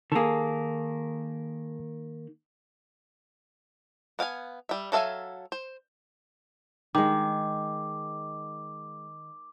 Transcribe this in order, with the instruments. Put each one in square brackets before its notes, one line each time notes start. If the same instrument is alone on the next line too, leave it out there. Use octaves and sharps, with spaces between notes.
[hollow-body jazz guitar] D#3 A#3 [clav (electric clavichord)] G#4 A4
[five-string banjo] B3 F5 G5 G#5
G3 E5
F#3 A4 E5 F5 G#5
C5
[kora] D#3 G#3 [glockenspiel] D6